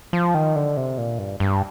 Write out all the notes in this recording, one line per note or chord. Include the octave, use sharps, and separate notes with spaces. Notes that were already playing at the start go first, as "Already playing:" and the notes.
F3
D#3
D3
C3
A#2
G2
G2